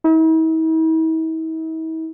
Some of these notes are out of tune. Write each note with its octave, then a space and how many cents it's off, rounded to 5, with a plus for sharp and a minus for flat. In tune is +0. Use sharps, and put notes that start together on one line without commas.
E4 -45